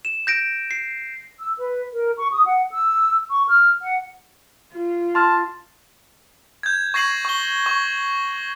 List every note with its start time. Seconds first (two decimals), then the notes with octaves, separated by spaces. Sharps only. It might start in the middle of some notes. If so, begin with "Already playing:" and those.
0.05 E7
0.27 G6 A#6 D7
0.71 C7
1.40 E6
1.58 B4
1.92 A#4
2.17 C#6
2.32 D#6
2.45 F#5
2.72 E6
3.30 C#6
3.47 F6
3.81 F#5
4.73 F4
5.15 A5 C6 F6
6.63 G6 G#6
6.94 C#6 G#6 A#6 C7 D#7 F#7
7.25 C#6 G7
7.66 C#6